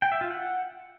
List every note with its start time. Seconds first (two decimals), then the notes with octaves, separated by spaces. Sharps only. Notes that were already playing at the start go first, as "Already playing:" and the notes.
0.02 G5
0.12 E5
0.21 F4
0.31 F#5